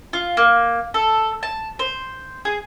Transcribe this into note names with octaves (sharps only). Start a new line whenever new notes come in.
F4
A#3
A4
A5
C5
G#4